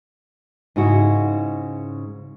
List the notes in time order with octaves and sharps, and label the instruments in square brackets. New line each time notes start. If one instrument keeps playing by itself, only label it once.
[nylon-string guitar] G#2 C#3 E4 F#4